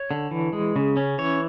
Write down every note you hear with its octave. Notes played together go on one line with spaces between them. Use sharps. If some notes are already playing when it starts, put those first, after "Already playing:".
Already playing: C#5
D3
E3
G#3
C#3
C#4
E3 C#5